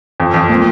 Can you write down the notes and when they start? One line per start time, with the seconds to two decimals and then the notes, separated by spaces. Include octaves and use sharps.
0.20 F2
0.34 F2
0.49 A#2